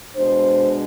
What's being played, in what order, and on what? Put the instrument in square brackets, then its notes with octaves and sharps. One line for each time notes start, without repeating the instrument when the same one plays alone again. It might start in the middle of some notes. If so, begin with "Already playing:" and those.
[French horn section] B2 G#3 D4 C5